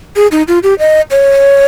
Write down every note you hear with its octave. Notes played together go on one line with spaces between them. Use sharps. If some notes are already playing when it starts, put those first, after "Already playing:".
G#4
D#4
F4
G4
D#5
C#5